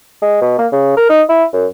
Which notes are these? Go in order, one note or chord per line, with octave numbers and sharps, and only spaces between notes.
G#3
B2
A#3
C#3
A#4
D#4
E4
F#2